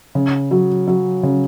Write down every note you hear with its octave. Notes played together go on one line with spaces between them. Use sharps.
C#3
F#3
F#3
C#3